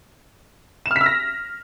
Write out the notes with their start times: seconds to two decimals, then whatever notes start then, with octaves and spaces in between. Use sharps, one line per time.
0.86 E7
0.91 F6
0.96 B6
1.01 E6
1.06 A#6